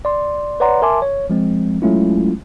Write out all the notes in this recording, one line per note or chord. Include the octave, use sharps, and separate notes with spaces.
D5 C6
B4 C#5 D5 F#5 A#5 C6
A#4 E5 G#5 A5 C6 D6
C#5
F3 G#3 C4
F#3 G#3 A3 C#4 E4 F4